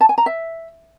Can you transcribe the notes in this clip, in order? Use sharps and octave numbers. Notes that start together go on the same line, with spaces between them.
A5
G#5
A#5
E5